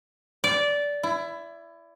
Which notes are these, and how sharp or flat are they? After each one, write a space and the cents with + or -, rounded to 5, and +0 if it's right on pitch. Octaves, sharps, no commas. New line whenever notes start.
D5 -15
E4 +20